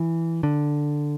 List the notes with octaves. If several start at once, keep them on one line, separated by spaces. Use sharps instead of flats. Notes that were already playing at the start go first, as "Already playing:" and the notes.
Already playing: E3
D3